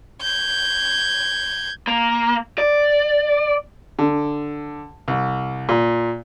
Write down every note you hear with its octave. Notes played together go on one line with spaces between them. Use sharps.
G6 G#6
A#3
D5
D3
C2
A#2